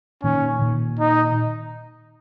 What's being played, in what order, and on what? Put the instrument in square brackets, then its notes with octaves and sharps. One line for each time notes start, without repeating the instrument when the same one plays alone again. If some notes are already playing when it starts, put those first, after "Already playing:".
[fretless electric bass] A#2 D#3 [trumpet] C#4
[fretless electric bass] A#2 D#3
[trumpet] D#4